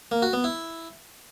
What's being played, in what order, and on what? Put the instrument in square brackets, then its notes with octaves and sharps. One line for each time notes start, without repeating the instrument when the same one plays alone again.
[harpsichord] A#3
F#4
B3
E4